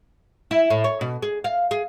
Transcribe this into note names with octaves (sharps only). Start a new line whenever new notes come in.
E4
A2
C#5
B2
G#4
F5
G#4